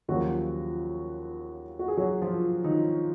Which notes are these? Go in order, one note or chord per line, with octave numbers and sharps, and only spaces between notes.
D#2 C#3 F3 F#3 F#4
F#4
G#4
F#3 F#4
F3 F4
D#3 D#4